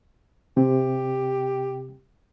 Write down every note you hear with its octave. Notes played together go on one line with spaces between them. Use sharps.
C3 G4